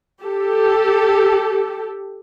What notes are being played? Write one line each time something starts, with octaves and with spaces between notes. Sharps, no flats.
G4 A4